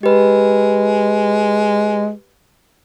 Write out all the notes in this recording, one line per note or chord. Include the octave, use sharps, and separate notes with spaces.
G#3 G4 B4